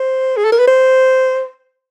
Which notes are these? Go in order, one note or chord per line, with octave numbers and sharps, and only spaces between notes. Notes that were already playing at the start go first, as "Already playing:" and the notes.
Already playing: C5
G#4
A4
A#4
B4
C5